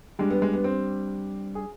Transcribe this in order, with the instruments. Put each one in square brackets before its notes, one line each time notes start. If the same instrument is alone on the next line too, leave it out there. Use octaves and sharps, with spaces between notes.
[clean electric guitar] G3 D4 G4 [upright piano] G#3
[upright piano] B3
G#3
B3
C4
G#4